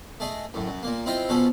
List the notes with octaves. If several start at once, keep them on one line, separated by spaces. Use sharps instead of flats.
A3 G#4 D#5
F#2 A2
F#2
A#2 A#3
C4 E4 F4 D#5 G5 C6
B2 F3 C#4 G#4 A4